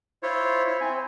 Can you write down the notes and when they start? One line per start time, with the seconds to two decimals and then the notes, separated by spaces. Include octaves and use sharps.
0.23 E4 F4 C5 C#5
0.68 E4
0.80 C4 G#5
0.94 C5